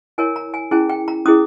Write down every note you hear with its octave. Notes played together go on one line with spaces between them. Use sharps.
E4 A#4 C#5 G#5
A#5
G#5
C#4 E4 G#4 G#5
G5
A#5
C#4 E4 G#4 D#6